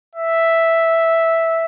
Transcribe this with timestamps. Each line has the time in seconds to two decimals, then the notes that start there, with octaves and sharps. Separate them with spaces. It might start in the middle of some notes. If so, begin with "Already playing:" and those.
0.15 E5